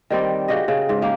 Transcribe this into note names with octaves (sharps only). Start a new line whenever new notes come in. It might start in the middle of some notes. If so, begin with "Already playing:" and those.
D#3 G3 C4 D5
C#3 F#4 G4 D#5
C#3
G#2
A#3 G4